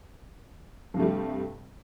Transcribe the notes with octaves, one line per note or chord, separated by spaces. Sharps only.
G2 C3 G3 A3